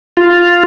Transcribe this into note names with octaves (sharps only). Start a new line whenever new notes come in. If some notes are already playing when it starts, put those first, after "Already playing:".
F4